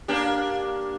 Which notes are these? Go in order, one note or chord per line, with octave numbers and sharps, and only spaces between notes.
A#3 D4 G4